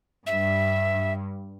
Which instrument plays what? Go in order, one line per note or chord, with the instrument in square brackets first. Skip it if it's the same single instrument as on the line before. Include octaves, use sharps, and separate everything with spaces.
[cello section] G2 [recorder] E5